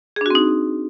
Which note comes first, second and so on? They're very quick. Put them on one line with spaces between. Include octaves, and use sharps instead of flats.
G#4 D4 F#4 C4 D#4